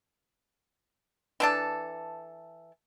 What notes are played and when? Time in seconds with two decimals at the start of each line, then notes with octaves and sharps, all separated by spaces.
1.40 E3 D4 A4